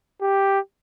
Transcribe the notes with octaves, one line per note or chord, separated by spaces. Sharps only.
G4